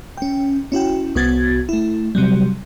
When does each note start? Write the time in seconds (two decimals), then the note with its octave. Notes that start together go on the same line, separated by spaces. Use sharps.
0.17 C#4 G5
0.72 C#4 E4 F#4 G5
1.15 C2 B3 F#4 G#6 A6
1.69 A3 E4
2.15 C3 F#3 G3